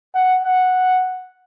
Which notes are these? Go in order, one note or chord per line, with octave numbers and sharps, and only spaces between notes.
F#5
F#5